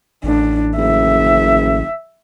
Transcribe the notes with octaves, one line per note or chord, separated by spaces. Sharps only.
A1 D4
F#1 E5